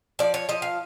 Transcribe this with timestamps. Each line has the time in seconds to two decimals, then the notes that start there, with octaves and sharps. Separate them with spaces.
0.19 F3 D5
0.34 C#5
0.49 F3 D#5
0.62 F5